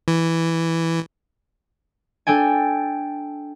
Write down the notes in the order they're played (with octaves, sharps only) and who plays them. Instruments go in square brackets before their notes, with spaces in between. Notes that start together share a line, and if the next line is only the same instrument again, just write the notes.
[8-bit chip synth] E3
[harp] D4 A4 G5 G#5